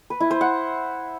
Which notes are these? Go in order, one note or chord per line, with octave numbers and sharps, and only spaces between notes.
B4
E4
C5
F#5